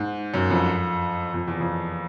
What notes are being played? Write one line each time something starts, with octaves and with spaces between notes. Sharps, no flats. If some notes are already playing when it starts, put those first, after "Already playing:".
Already playing: G#2
F#2
F2
F2
E2
F2